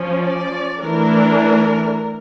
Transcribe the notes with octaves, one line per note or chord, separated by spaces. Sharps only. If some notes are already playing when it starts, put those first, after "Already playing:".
Already playing: F3 C#4
D5
E3 A3 D4 A#4